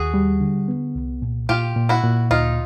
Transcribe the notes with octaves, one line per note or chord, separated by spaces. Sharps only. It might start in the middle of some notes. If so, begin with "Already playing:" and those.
Already playing: D#2 F#4 G#4
G3
D3
B3
C2
A#2
A#2 F4 G4
A#2
E4 F#4
A#2
D2 D#4 F4